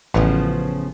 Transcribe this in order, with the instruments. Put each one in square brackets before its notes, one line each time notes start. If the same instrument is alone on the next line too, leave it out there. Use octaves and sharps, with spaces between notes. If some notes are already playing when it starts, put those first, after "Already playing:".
[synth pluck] A1 [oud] C#3 F3 B3